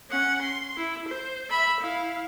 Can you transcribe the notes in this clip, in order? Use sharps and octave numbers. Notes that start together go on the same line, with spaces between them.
C#4 F#5
C6
E4
C5
E5 B5
E4 F5